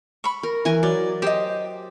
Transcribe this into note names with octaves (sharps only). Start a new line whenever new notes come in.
B5 C#6
A#4
E3 A#4 G#5
F#3 D5
G4 C5 D#5